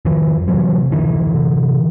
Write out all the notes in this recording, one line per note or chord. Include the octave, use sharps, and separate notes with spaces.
F2 D#3 F3
C3 E3 F#3
F2 D3 E3
C3